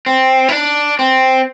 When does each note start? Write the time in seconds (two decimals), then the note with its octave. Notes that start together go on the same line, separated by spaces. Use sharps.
0.06 C4
0.48 E4
0.52 D4
0.99 C4